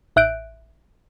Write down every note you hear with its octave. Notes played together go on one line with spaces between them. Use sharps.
A1 E5 F#6 G6 D7